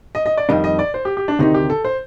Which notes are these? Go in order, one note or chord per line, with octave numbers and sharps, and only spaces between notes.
D#5
D#5
D5
F2 D#3 G3 D4 D#5
D#5
D5
C5
G4
G4
D4
D2 C3 D#3 D#4
G4
A4
C5